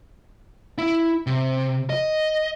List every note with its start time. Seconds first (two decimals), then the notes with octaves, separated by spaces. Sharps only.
0.78 E4
1.27 C3
1.90 D#5